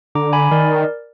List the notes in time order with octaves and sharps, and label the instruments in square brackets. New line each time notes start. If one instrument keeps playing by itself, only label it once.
[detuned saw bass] D3 [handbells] A#5 D6
[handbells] G#5 B5
[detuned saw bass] D#3 [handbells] A#4 D5